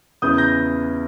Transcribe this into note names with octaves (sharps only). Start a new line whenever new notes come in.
E2 C#3 E3 D#6 G6
G6 A#6